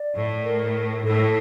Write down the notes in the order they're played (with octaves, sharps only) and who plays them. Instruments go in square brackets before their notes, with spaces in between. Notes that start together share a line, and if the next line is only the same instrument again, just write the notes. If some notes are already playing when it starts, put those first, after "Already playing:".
Already playing: [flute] D5
[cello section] A2
[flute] A#4
[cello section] A2 [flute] A4